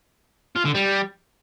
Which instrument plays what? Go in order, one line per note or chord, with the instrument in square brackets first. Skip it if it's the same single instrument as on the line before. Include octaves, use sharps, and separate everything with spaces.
[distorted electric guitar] F4
D3
G3